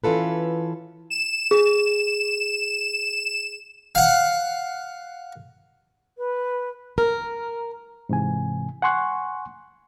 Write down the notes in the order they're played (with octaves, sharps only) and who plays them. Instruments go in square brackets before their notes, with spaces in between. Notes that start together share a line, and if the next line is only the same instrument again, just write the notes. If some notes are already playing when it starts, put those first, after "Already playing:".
[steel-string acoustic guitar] E3 C#4 F4 A4 B4
[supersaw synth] E7
[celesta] G#4
[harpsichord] F5 F#5
[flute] B4
[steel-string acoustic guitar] A#4
[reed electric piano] G#2 C3 E3 G#5
F#5 G#5 C6 C#6 F#6